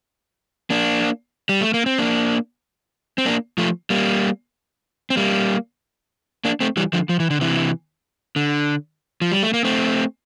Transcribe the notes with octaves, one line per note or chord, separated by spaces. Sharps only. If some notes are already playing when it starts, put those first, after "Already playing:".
A#3 D4
G3
A3
A#3
C4
A#3 D4
C4
A#3 D4
F3 A3
G3 A#3
C4
G3 A#3
A#3 D4
A3 C4
E3 G3
D3 F3
F3
E3
D3
C3 E3
D3
F3
G3
A3
A#3
A3 C4